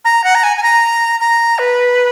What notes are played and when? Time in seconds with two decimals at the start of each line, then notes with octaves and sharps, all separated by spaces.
0.05 A#5
0.24 F#5
0.35 A#5
0.43 G#5
0.57 G#5
0.63 A#5
1.20 A#5
1.59 B4